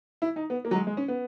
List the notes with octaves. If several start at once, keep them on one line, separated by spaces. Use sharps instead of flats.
E4
D#4
B3
A#3
F#3
G#3
G#3
C#4
B3